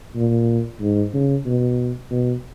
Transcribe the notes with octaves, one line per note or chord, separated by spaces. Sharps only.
A#2
G#2
C#3
B2
B2